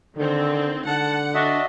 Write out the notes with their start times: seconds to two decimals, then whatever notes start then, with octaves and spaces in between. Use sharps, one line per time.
0.17 D3 D#3 C4
0.87 D3 F#5 A5
1.35 D4 F#4 D#5 E5